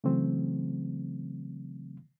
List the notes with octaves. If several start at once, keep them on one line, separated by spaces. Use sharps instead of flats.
C#3 E3 F#3 A3 C4